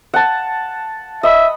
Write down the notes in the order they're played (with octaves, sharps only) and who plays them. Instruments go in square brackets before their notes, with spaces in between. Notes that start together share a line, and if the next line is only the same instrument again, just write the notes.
[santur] F#5 A5
[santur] D#5 B5 [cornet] E5